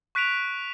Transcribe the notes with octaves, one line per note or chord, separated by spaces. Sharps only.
C#6 F#6 B6 D7 F7